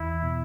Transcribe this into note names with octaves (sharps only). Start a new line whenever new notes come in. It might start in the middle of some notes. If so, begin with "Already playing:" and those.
Already playing: E2 E4
B2